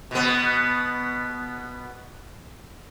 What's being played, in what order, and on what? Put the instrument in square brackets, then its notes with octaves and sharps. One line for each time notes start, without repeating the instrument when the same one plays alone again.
[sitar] B2 B3